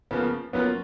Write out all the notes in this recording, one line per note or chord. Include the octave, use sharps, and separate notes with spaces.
C#3 F3 A#3 B3
F#3 A#3 B3 C#4 F4